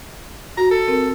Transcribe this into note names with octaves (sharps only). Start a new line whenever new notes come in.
F#4 A#5
A4
C4 A#4